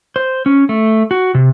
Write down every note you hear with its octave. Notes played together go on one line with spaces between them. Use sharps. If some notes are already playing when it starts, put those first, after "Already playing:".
C5
C#4
A3
F#4
C3